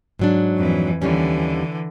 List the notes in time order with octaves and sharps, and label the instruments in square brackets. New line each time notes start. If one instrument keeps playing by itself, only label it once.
[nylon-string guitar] G#2 F#3 D4
[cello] F2 E3
[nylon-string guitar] D#2 G3 C#4 [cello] D3 E3